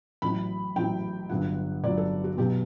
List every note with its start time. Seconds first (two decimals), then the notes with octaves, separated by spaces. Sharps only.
0.22 A1 A2 F#3 B5
0.76 A1 A2 F#3 G5
1.29 G1 G2 F#3 F#5
1.84 G1 G2 F#3 D5
1.97 A4
2.24 F#4
2.37 B1 B2 F#3 G4